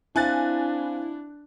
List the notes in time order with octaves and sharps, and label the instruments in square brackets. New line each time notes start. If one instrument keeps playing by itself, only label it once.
[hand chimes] C4 C5 F5 [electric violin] D4 [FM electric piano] E4 [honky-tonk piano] G#5 F#6 A6